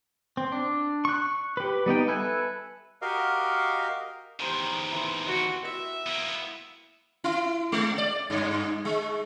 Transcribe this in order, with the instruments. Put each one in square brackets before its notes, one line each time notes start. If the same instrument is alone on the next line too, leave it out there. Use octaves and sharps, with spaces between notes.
[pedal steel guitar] C4
D4
C#6 F#6
G4 B4
G3 B3 D#4 G5
A4 B4 E5 G#5
[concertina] F#4 G4 A#4 D#5 F5
[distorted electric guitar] E2 D#3 [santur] G4 C5 A#5
[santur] E4 B4 C6
[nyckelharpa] F#4
E5
[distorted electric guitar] A#3 B3
[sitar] E4
G#3
D5
G2
G#3